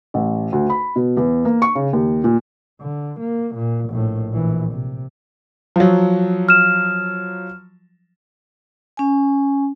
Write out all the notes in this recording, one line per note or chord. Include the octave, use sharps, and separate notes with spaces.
A1
D2
B5
B2
E2
A#3
C#6
C#3
D#2
A#2
D3
A#3
A#2
A#1 A2
A#1 E3
C3
F3 F#3
F6 E7
C#4 G#5